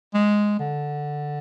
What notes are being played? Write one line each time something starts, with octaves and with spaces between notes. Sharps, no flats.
G#3
D3